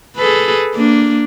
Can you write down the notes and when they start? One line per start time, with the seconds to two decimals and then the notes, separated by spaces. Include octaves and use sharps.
0.16 G#4 A4 B4
0.75 A#3 D4